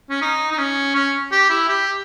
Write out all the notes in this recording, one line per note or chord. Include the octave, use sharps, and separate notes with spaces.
C#4
D#4
D#4
C#4
C#4
G4
E4
G4